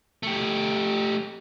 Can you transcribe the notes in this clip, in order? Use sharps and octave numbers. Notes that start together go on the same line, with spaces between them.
A3 G4